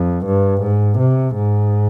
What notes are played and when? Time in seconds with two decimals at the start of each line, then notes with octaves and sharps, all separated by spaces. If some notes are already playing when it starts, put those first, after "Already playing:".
Already playing: F2
0.25 G2
0.62 G#2
0.99 C3
1.35 G#2